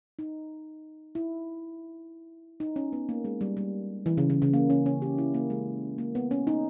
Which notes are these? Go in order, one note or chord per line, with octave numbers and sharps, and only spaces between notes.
D#4
E4
D#4
C#4
B3
A#3
G#3
G3
G3
E3
C#3
C#3
C#3
A#3
C#4
C#4
G4
E4
A#3
G#3
A#3
B3
C#4
D#4